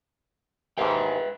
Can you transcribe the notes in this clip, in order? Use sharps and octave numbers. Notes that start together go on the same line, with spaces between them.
D#2 G#2 B4 E5 G5